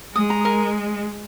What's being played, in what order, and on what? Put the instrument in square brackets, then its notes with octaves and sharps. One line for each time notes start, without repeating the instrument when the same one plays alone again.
[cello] G#3 [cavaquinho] D#6
[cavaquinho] A#5
A#4